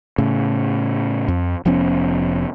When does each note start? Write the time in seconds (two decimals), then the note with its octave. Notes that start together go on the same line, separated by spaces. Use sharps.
0.18 A2 C#3
1.28 F2
1.65 F1 F3 B3 C#4